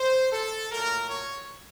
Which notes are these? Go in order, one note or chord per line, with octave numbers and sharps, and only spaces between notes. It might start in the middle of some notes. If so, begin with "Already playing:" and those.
Already playing: C5
A4
A#2 F#3 A3 A#4
C#5